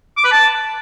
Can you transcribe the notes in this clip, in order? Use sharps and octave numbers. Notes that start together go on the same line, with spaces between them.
D6
B4
A5